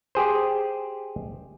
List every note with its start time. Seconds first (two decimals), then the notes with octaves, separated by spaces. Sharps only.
0.15 G4 G#4 C5